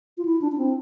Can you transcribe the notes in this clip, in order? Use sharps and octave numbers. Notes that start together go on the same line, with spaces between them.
F4
E4
D4
D4
C4